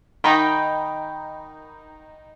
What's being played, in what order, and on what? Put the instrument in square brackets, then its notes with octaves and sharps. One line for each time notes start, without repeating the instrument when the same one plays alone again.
[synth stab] D#3 D#4 [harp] G5 B5